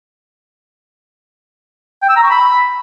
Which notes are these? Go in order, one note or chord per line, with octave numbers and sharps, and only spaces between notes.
G5
E6
A#5
C#6
B5